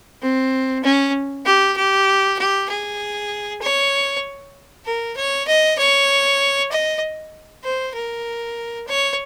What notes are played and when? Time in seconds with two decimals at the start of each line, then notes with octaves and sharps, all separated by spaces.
0.22 C4
0.84 C#4
1.46 G4
1.77 G4
2.38 G4
2.69 G#4
3.62 C#5
4.86 A#4
5.17 C#5
5.48 D#5
5.78 C#5
6.72 D#5
7.64 C5
7.95 A#4
8.88 C#5